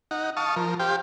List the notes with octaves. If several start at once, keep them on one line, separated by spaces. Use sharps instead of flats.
D#4 F#5
F5 A5 C#6 D#6
F3 A#4
G4 C5 F5 G5